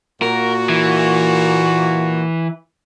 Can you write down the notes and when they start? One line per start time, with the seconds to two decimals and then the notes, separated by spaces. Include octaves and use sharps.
0.22 A#2 A#3 F#4 A#4
0.69 E3